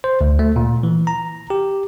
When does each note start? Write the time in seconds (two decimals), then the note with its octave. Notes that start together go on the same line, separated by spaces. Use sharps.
0.04 C5
0.21 D2
0.39 A3
0.56 A#2
0.83 E3
1.07 A#5
1.50 G4